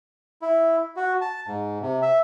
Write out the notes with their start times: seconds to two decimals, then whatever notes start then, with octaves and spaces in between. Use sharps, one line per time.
0.42 E4
0.96 F#4
1.21 A5
1.47 G#2
1.82 C3
2.02 E5